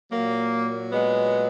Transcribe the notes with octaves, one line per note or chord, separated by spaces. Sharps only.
A#2 F#3 A#3
G#3 B3